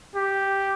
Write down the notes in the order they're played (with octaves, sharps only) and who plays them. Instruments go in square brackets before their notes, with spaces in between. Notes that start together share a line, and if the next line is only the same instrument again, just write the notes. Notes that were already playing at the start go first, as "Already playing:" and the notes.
[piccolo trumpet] G4